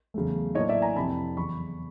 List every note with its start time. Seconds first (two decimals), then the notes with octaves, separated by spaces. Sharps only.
0.14 E2 C#3 F#3 A3
0.55 A2 F#3 A#3 D4 C#5 D#5
0.69 D5 E5
0.82 G#5 A#5
0.96 F2 C3 E3 A5 B5
1.37 E2 C#3 F#3 B5 C#6